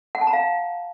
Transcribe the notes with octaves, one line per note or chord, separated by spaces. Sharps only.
F#5
A5
A#5
F5